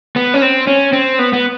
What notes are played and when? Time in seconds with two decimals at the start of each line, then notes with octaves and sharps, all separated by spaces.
0.16 B3
0.34 C#4
0.42 C4
0.67 C#4
0.93 C4
1.19 B3
1.33 B3